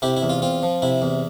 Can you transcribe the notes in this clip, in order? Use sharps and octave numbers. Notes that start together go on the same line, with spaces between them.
C3 E4 G4
E4
E2
F4
C4 F4
F3
C3 E4
E2